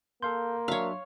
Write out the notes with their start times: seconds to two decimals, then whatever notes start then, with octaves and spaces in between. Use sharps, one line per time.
0.22 A#3 A4 F5 C6 G6
0.68 F#3 D4 C#5 E5 F5